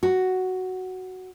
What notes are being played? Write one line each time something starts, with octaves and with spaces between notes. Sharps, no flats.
F#4